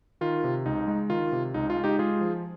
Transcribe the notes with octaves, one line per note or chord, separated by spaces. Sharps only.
D#3 F4
C3
C#2 D#4
G#3
D#3 F4
C3
C#2 D#4
F4
G#3
D#4 G4
G#3 F4 G#4
F3